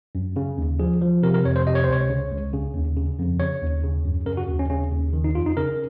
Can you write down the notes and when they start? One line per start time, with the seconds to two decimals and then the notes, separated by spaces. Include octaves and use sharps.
0.15 F#2
0.36 C#3
0.58 D#2
0.79 F3 G#4
1.02 F3
1.23 C3 A#4
1.34 A#4
1.45 F2 C#5
1.56 C5
1.67 C3 D#5
1.75 C#5
1.84 C5
1.88 C#2 C#5
2.10 C#3
2.32 C#2
2.53 C#3
2.75 D#2
2.96 C#3
3.18 F2
3.40 C#3 C#5
3.62 D#2
3.83 C#3
4.05 F#2
4.26 C#3 A#4
4.37 F#4
4.48 D#2
4.59 C#4
4.70 C#3 C#4
4.92 D#2
5.13 D#3
5.24 D#4
5.35 F2 F4
5.46 D#4
5.57 C#3 A#4